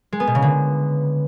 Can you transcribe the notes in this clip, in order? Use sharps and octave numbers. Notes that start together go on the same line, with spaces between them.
G#3
B3
B2
C#3
D3